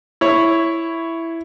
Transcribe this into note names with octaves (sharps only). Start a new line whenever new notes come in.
E4 C#5